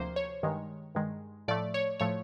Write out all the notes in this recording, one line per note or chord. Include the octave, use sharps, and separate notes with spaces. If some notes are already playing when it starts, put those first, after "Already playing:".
Already playing: D2 C3 F3 A#3 C5
C#5
G2 D#3 G#3
G2 D#3 G#3
A2 F3 A3 D5
C#5
A2 F3 A3 C#5